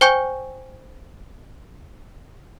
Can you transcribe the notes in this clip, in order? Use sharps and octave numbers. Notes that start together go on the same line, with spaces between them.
C5 G5 G#5 C#6 G6